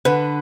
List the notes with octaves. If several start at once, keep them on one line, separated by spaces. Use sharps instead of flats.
D3 B4